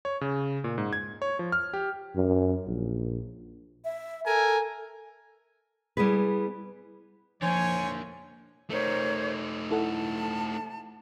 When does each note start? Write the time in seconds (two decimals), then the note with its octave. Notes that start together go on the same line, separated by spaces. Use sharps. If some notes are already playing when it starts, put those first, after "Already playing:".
0.05 C#5
0.21 C#3
0.64 A#2
0.78 G#2
0.93 G#6
1.22 C#5
1.39 F3
1.52 F6
1.73 G4
2.16 F#2
2.67 A#1
3.85 E5
4.26 A4 A#4 G#5
5.97 G3 B3 E4 G#4 B4
7.42 D3 F3 A#3 C5 C#5 G#5
8.70 A3 D#4 A#4 C5 C#5
9.71 E4 A4 F#5 A5